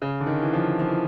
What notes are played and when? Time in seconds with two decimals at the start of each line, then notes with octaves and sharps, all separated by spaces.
0.02 C#3
0.20 D3
0.26 D#3
0.43 E3
0.53 F3
0.79 F3
0.88 E3